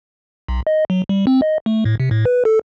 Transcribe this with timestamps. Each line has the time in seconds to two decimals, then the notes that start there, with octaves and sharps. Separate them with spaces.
0.48 B1
0.67 D#5
0.90 F#3
1.09 G3
1.27 C4
1.42 D#5
1.66 A3
1.85 A2
2.00 C3
2.11 A2
2.25 B4
2.45 A4